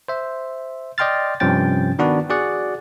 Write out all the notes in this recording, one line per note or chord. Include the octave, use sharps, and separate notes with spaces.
C5 E5
D5 D#5 G5 C6 F6 A6
G2 C3 F3 C#4 G5 A6
D#3 B3 D4 F#4 B4 D5
F#4 G#4 D5 F#5